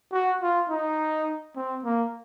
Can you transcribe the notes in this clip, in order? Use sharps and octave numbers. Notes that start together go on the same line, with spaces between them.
F#4
F4
D#4
C4
A#3